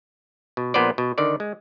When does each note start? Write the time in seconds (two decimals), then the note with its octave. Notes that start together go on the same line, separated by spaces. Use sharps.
0.57 B2
0.74 A#1 A#2 B3 B4 C5 D5
0.98 B2
1.18 D3 D#3 D5
1.40 G#3